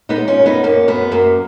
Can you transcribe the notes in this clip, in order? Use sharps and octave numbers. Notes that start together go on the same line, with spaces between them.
B3 D#4
G#3
C#4 F4
F#2
B3 D#4
F#2 A#3 C#4
F#2 B3
F#2 A#3